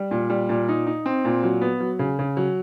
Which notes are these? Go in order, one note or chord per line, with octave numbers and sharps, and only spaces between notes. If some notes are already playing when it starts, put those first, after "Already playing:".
Already playing: G3
A#2
G3
A#2
D#4
D#4
C4
A#2
F#3
B3
F#3
C#3
C#3
F#3